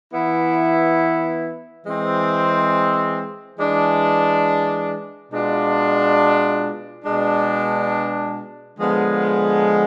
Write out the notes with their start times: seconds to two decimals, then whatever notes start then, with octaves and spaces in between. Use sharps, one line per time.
0.12 E3 B3 E4
1.85 E3 G#3 C4
3.58 E3 G#3 D4
5.30 B2 G#3 D4 F4
7.04 B2 G#3 D4
8.77 D3 F3 G#3 B3